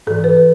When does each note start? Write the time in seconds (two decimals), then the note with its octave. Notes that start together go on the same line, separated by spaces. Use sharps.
0.07 G#2 E3 A4
0.24 B4